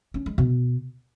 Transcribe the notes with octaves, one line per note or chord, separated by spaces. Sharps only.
C#4
G#3
B2